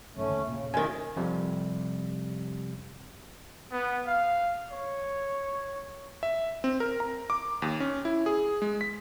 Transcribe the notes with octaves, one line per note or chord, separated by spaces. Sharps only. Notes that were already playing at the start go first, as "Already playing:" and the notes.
B1 G#2 E3 A3 C#4
D#2 D3
E1 A#2 C#3 A#3
F#2 D#3 G3 G#3 G#5
F2 C3 G3
B3
F5
C#5
E5
C4
A#4
A#5
D6
D#2
C#4
E4
G#4
G#3
B6